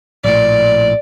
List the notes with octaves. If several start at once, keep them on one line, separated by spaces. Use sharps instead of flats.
A#1 A2 D5